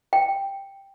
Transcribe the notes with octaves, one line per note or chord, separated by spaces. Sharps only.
G5